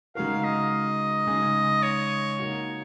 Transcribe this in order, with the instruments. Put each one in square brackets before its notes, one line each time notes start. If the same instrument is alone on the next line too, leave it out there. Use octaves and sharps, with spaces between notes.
[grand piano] C#3 G#3 D#4 F#4 A#4 [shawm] F5
[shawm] D#5
[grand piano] C#3 G#3 D#4 G#4
[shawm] C#5
[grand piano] A#3 D#4 F#4